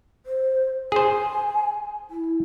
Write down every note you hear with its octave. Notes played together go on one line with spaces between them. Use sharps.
C5
G#4 C5 G#5
E4